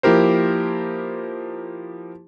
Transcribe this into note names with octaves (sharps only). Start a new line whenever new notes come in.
F3 A#3 E4 G4 A#4 C5